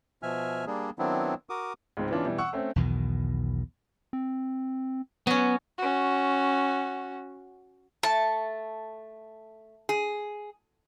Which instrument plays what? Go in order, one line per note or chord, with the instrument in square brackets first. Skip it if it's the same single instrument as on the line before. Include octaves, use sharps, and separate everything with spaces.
[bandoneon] B2 F3 E5 G#5 F6
G3 A#3 D4 G#4
D#3 F#3 B3 C4 D4 E4
F#4 A#4 D6 D#6
[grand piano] C#2 G#2 G#3 C4
E3 B3 C#4 D4 F4
B2 E3 G3
F#5 C#6 E6
A3 C4 C#4
[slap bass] B1 E2 B2 D#3
[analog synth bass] C4
[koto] F#3 C#4 [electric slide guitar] B3
[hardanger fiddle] C#4 F#4
[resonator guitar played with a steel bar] A3 [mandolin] A5
[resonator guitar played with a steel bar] G#4